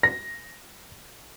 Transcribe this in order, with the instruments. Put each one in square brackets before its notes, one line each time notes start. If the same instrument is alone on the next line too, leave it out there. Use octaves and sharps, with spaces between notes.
[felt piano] A#6